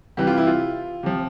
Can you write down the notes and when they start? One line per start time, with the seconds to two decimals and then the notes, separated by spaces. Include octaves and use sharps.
0.17 C3 E3 G3 G4
0.27 F4
0.37 E4
0.47 F4
1.03 C3 F3